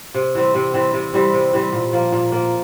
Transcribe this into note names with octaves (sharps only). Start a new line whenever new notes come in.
C3
E3 G3 C4
C3
E3 G3 C4
C3
E3 G3 C4
C3
E3 G3 C4
A#2
F3 A#3
A#2
F3 A#3